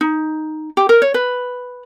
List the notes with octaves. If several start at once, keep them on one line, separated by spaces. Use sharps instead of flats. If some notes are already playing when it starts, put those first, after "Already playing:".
D#4
G4
A#4
C#5
B4